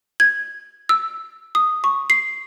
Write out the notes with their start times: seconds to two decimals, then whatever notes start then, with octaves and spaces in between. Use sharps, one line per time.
0.20 G#6
0.89 E6
1.55 D#6
1.84 C#6
2.10 C7